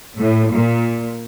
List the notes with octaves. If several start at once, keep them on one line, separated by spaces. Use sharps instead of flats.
A2
A#2